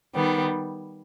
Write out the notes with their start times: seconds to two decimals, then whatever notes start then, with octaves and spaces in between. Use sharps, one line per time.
0.15 D#3 G3 B3